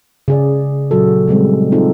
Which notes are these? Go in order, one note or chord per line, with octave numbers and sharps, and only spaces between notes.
C#3 G#4 D5
A#2 F#3 F#4 A4
C#3 G3 G#3 C4
C4 D#4 F4 A4